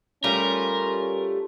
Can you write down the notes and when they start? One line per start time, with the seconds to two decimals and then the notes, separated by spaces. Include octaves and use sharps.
0.24 G3 A3 C#4 F4 A#4